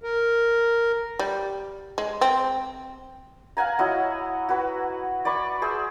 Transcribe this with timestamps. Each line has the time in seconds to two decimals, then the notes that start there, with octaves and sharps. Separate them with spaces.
0.03 A#4
1.19 G3
1.98 G#3
2.21 C4
3.57 F5 F#5 G#5 A#5
3.79 E4 F#4 C#5 D#5
4.49 F#4 B4
5.25 D5 G#5 B5 C#6
5.62 G#4 C5 E5